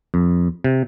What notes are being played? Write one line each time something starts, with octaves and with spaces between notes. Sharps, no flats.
F2
C3